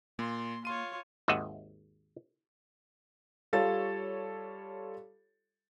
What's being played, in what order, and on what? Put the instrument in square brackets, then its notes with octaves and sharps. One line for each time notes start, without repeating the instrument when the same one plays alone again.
[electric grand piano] A#2 [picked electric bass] A#3 [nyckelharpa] C6
[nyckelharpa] F4 C#5 [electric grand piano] C6 D#7
[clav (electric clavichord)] G#1 D#2 D#5 E5 F#5
[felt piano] G3 F4 A4 C#5 A6